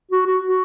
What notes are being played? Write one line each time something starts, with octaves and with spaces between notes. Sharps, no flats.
F#4
F#4
F#4